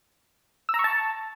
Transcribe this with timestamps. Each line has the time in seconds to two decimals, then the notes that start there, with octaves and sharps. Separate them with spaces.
0.69 E6
0.74 A#5
0.79 C#6
0.84 A5